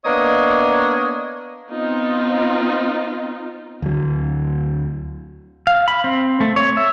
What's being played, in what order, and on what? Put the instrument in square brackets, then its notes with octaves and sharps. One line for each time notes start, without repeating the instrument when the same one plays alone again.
[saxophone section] A#3 B3 D4 C#5 D#5
[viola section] B3 C4 D#4 F4
[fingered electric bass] D2 F#3
[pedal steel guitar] F5
B5
C4
A3
C#5
E5